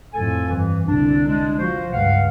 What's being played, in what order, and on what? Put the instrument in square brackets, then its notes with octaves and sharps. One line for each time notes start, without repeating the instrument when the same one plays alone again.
[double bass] F2 A2 [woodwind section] A4 G#5
[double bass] G2 [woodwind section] E3
[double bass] C2 D3 [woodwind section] D4
[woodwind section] G#3 D4
[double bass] F3 [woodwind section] F#4 C5
[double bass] C#2 G2 [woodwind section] F5 F#5